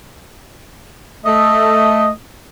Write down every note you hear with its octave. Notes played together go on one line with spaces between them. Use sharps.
A3 D#5